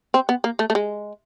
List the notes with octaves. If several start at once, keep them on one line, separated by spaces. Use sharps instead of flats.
C4
B3
A#3
A3
A3
G#3